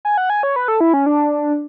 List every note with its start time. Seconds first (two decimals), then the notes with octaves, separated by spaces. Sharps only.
0.05 G#5
0.18 F#5
0.30 G#5
0.43 C#5
0.56 B4
0.68 A4
0.81 E4
0.94 C#4
1.06 D4